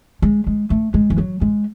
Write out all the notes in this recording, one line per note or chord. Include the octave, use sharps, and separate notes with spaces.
G#3
G#3
A3
G#3
E3
F#3
G#3